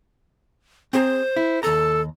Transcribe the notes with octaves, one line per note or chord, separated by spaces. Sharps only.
C4 G#4 C5 A#5
E4
D#2 A4 A#5